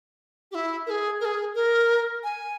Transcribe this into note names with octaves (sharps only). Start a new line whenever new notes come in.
G4
E4
A#4
G#4
A#4
G#4
A#4
G#5